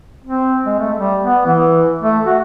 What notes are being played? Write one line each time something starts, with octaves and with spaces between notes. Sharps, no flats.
C4
G#3
A3
G3
B3
E3
A3
F#4